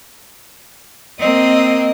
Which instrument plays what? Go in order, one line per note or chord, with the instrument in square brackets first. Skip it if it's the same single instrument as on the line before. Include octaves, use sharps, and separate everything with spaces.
[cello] A#3 C4 [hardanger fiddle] D#5